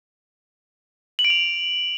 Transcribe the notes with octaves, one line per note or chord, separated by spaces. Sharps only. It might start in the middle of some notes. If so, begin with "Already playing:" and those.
F#7
D7
F7